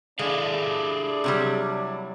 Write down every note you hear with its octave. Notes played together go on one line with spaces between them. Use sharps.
G#3 D4 E4 G#4 A4 D5 F5
C3 F#3 G3